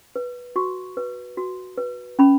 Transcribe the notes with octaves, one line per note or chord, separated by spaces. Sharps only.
B4
F#4 C#6
B4
F#4
B4
C#4 B5